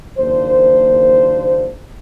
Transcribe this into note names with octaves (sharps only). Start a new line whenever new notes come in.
F#1 D#2 A#3 D4 C5